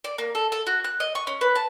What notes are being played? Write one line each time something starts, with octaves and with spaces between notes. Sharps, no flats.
D5
A#3
A4
A4
F#4
F#6
D#5
C#6
C#4
B4
A5